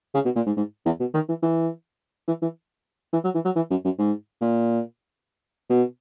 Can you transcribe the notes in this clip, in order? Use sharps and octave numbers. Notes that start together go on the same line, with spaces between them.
C#3
B2
A#2
G#2
G#2
E2
B2
D#3
E3
E3
E3
E3
E3
F#3
E3
F#3
E3
F#2
F#2
G#2
A#2
B2